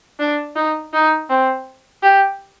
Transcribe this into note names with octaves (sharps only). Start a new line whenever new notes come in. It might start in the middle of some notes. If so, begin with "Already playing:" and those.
D4
D#4
D#4
C4
G4